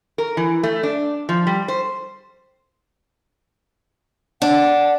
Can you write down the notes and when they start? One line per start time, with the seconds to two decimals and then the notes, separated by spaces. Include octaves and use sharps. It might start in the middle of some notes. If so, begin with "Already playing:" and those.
0.18 A#4
0.37 E3
0.63 A3
0.83 D4
1.29 F3
1.47 G3
1.68 C5
4.42 D4 F#5